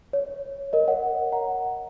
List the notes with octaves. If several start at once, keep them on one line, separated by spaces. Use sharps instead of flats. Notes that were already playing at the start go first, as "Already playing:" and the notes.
C#5
A#4 D#5
C#5 F#5
F#5 A#5